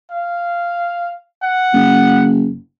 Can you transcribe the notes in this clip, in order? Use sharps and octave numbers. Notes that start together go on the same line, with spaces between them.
F5
F#5
F#1